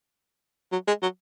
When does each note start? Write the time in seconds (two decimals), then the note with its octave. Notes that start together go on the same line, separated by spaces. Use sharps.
0.72 F#3
0.88 G#3
1.03 F#3